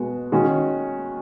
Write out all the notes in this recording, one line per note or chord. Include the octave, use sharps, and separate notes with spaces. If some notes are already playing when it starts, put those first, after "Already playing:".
Already playing: B2 G#3 B3 F#4
D#3 G#3 C#4 F#4